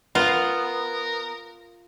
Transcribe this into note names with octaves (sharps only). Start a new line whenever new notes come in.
B3 F4 A#4